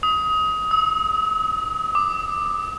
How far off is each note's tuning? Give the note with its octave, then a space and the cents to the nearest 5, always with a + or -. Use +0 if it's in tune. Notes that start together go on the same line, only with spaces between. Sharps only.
D#6 +25
E6 -45
D6 +20